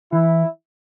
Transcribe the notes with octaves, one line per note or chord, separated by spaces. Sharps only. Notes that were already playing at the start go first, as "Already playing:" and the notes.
E3 E4